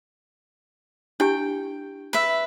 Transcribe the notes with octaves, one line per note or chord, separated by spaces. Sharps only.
D4 E4 G4 G5
B4 E5